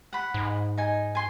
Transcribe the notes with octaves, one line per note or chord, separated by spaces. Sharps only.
F#5 B5
G#2
D#4 G#5
G#5 C6